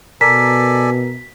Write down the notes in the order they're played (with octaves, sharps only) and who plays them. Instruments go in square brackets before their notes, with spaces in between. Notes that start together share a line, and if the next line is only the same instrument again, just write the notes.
[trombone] B2 [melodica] A4 D5 G#5 [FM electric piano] A#4 [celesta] B6